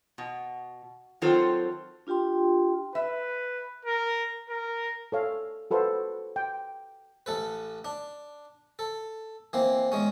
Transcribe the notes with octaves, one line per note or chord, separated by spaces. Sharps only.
B2
D#3 F#3 C4 F4 A4 C5
D4 F4 G4 G5 C6
B4 E5
A#4
A#4
A4 C#5 F5
F#4 A4 B4 C5 F5
G5
A1 A4 B4
D4
A4
E3 A#3 C4
E2 G#3 C#4